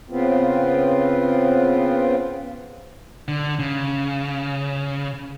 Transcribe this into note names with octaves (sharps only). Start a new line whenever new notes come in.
C#3 B3 C4 F4
D3
C#3